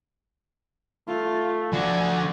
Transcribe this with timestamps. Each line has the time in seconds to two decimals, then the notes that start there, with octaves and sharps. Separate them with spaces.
1.08 A3 F4
1.73 D3 F3 F#4 D5 G#5